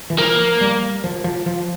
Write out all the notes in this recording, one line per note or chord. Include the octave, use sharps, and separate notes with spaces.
E3
F3 A#3
G3
F3
F3
F3